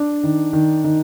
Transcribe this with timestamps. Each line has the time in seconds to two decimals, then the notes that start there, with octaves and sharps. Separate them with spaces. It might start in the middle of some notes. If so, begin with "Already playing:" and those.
Already playing: D4
0.24 D#3
0.53 D#3
0.84 D#3